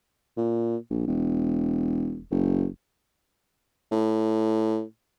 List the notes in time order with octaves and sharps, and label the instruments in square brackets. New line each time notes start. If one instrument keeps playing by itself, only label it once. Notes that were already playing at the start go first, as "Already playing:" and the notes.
[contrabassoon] A#2
A#1
E1
F#1
A2